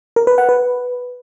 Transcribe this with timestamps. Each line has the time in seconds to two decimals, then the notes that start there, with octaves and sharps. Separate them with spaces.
0.16 A#4
0.27 B4
0.38 F#5
0.49 B4